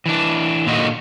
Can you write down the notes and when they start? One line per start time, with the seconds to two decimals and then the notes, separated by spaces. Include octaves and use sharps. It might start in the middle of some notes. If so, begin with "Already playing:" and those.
0.06 E3 D4
0.67 A#2 D3 D#3 D#4 F#4